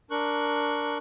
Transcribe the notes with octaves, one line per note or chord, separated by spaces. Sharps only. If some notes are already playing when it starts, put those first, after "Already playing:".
D4 A#4 C#6 F#6